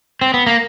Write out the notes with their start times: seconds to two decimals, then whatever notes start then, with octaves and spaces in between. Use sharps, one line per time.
0.21 C4
0.34 B3
0.47 A#3